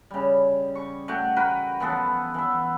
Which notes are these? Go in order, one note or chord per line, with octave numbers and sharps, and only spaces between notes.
C#3 G3
C#6
A3 F#4 G5
F#4 A#4 B4
E3 F3 B3 A4
E3 E5